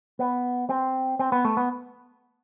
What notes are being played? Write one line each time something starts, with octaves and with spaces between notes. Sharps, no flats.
B3
C4
C4
B3
A3
B3